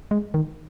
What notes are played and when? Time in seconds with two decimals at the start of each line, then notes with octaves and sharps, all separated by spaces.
0.11 G#3
0.34 D#3